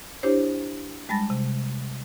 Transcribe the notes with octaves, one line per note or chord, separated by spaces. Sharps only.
D4 E4 G4 C5 C#5
G3 G#3 A5 B5 A6 A#6
C3